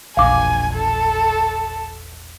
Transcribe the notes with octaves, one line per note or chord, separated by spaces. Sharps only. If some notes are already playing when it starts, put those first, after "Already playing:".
E1 A#1 F5 G#5 D6
A4